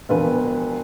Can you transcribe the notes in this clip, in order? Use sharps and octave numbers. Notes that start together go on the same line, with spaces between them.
E1 E2 D3 F3 B4